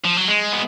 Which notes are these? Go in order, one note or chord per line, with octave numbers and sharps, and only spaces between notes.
F3
F#3
G#3
B3